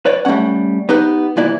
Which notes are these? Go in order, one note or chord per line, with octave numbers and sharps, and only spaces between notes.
B4 C#5 D5
G3 A3 A#3 C#4 F#5
B3 D#4 G4 B4
C2 A#2 E3 B3 E4 D5